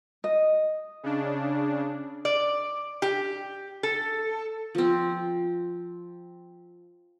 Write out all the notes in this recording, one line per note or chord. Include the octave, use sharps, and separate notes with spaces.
D#5
C#3 D4
D5
G4
A4
F3 C4